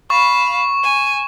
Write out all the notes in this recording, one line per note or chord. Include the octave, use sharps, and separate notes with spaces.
F5 B5 C#6
G#5